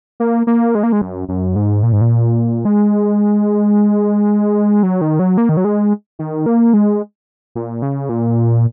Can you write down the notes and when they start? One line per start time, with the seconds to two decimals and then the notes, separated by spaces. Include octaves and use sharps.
0.20 A#3
0.47 A#3
0.75 G#3
0.83 A#3
0.92 G#3
1.02 F#2
1.29 F#2
1.56 G#2
1.83 A#2
1.92 G#2
2.01 A#2
2.65 G#3
4.83 F#3
5.01 D#3
5.19 F#3
5.38 A#3
5.49 D#3
5.57 F#3
5.65 G#3
6.19 D#3
6.46 A#3
6.74 G#3
7.55 A#2
7.82 C#3
8.09 A#2